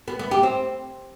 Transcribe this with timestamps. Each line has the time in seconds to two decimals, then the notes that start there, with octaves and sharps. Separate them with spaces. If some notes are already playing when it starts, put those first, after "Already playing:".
0.08 B3
0.19 B3
0.31 G4
0.43 C4